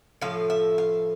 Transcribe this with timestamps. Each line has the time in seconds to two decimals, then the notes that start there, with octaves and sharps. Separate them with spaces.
0.22 A2 F3 F5
0.50 E5
0.78 F5